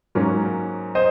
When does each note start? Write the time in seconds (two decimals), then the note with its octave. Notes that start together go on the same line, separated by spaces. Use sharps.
0.15 G#2 F#3 A#3 C#4
0.95 C5 D#5